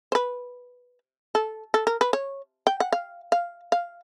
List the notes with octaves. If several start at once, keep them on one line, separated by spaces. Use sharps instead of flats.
C5
B4
A4
A4
A#4
B4
C#5
G5
F#5
F5
F5
F5